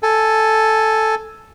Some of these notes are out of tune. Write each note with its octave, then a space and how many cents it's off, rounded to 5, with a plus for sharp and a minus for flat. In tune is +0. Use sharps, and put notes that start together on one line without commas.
A4 +0 G#5 +5